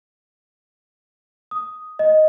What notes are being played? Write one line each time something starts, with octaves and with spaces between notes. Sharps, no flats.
D#6
D#5